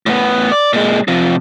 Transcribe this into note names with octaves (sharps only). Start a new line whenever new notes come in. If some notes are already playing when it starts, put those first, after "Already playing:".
A2 B3
D5
A#2 G#3
C3 F3